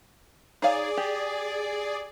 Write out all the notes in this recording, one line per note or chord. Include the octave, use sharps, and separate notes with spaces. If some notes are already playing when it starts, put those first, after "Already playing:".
D#4 G#4 C#5 D5 F5
G4